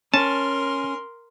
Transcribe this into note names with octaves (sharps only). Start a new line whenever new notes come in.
C#4 A#4 A5 C6